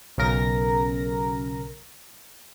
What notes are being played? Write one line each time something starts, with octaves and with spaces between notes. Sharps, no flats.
B1 C#3 A#4 A#6